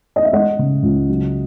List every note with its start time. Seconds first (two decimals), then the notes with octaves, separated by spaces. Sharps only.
0.16 D#5
0.25 E5
0.33 G#3 D#5 F#5
0.59 C#3
0.83 C#2
1.09 F#3